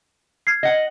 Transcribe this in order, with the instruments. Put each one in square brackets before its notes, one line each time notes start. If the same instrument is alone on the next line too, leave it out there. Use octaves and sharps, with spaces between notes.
[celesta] F6 G#6 C7
[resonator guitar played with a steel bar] D#5 F#5